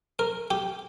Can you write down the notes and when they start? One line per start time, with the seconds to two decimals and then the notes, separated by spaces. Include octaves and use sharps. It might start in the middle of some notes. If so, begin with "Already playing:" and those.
0.19 A#4
0.51 G4